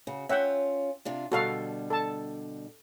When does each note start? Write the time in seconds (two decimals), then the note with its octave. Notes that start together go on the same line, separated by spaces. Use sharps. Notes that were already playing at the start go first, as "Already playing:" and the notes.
0.07 C#3 F#4
0.29 C#4 F4 E5 F#5 G5
1.05 C3 D4 F4
1.32 B2 D3 G3 F#4 A4 F5
1.90 A4 A5